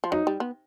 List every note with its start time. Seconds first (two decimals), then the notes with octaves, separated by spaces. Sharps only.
0.04 F3
0.12 F#3 D#4
0.27 G3
0.40 B3